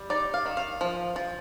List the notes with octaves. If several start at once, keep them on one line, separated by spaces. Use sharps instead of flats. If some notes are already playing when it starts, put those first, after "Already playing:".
Already playing: G3
D#4 D5
F5
D#3
F5
F3
F3